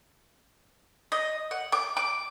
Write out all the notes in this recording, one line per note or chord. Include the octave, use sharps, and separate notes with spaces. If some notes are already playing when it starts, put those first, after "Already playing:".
D#5
F#5
D6
D6